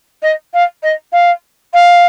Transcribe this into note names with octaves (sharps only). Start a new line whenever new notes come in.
D#5
F5
D#5
F5
F5